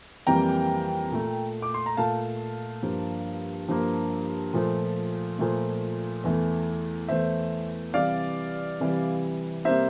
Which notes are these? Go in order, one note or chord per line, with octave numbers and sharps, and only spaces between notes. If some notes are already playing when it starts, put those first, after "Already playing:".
F2 E3 G3 A#3 G5 A#5
A#2 A3
D6
C6
A#5
A#2 A3 F5 A5
G2 F3 A#3
G2 F3 A#3
A#2 F3 A3
A#2 F3 A3
E2 E3 A3
E2 E3 A3 C5 E5
C3 E3 G3 D5 F5
C3 E3 G3
C3 G3 A#3 C5 E5